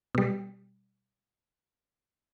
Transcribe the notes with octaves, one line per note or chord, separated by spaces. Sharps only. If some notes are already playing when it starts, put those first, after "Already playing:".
B2 G3